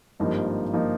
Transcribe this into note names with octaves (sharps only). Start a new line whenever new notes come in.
G#1 G2 F3 A#3 D#4
F3 A#3 D#4